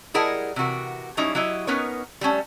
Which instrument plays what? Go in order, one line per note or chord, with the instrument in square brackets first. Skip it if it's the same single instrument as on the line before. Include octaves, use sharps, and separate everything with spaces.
[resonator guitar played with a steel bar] G3 E4 G#4 A#4 D#5 F#5
C3 E3 F#4 A#4
F#3 G3 C#4 D#4 E4
F#3 E4 G4 D#5
B3 C#4 D#4 A#4 B4 C#5
G3 A3 C#4